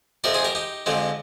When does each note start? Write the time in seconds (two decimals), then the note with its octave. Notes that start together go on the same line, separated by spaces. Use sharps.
0.24 F2 C3 F3 C4 A#4 D5
0.34 G#4 C5
0.44 G4 A#4
0.55 D#4 G4
0.86 F2 D3 F3 G#3 C4